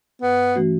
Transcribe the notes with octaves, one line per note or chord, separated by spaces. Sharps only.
G2 B3
E3 A3 C#4 F#4